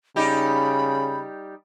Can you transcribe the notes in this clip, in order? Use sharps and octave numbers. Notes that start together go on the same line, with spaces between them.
C#3 G3 D#4 G4 B5